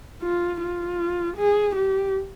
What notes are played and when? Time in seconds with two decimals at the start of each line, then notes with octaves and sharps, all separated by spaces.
0.22 F4
0.61 F4
1.37 G#4
1.76 G4